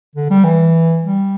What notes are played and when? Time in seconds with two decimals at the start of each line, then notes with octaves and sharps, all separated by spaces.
0.16 D3
0.30 G3
0.44 E3
1.03 G3